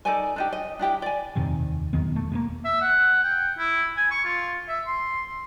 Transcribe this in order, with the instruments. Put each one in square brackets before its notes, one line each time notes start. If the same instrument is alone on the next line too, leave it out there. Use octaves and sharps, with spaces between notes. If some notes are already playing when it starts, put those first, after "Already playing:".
[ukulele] D#4 A4 D5 G#5
D4 D#4 G4
D#5
D4 E4 G4 G5
D5 G#5
[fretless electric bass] D#1 F2 C3 D#3
B1 E2 D#3 B3
A3
E1 A#2 A#3
[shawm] E5
F#5
G5
E4
G#5
C#6
F4
E5
C6